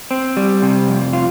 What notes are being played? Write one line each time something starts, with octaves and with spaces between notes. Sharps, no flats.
C4
G3
C3
F2
F4